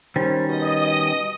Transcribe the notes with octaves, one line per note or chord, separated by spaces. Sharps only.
D#3 G3 C#4 C5
B2 D#5 D#6